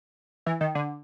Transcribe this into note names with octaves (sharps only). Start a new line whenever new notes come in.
E3
D#3
D3